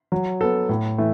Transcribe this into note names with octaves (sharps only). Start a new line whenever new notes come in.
F#3
B3 A4
A2
E3 A3